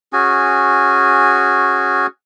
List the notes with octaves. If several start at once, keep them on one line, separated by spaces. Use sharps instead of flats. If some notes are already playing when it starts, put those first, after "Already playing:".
C#4 F#4 G#4 G#5